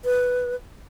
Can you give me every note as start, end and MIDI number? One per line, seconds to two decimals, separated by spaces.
0.05 0.55 71